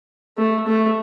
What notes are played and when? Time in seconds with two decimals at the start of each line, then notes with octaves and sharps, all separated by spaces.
0.38 A3
0.67 A3